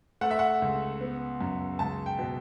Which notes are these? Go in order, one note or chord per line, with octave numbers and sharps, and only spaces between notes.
A3 F#5
E5
F#5
C#2
B3
F#2
C#2 A5
G5
B2